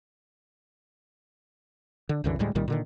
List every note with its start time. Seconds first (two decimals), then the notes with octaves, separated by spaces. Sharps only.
2.09 D3
2.24 C2 F#2 D3 E3
2.39 D2 A2 G3 G#3
2.55 C2 A#2 D#3 G3
2.68 A#2 D3 D#3